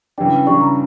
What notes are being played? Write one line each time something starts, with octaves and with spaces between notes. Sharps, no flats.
C#3 E3 G3 D4 G5
C#3 E3 G3 D4 C#6
A#5